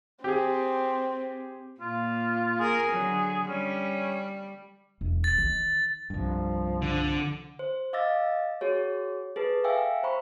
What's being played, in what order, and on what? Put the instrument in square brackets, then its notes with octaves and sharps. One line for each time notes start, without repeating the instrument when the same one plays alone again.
[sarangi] C4 [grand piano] G4 G#4
[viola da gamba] A#2 [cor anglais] F4
[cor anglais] G#4 [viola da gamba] A#4
[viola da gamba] D3 F#3
[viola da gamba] G3 [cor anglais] C#4
[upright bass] E1
[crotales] A6
[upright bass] D#3
[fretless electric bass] C2 G2 [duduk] F3
[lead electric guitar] D3
[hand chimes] C5
D#5 F5 D6 E6 A6 A#6
F#4 G#4 C#5
G#4 A4 B4
E5 F5 G5 G#5 E6
C5 A#5 B5 C#6